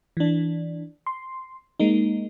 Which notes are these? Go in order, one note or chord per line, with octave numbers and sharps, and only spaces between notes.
E3 D4
C6
G#3 A#3 D#4